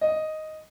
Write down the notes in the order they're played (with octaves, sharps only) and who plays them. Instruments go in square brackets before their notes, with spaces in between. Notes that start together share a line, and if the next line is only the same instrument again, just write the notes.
[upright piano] D#5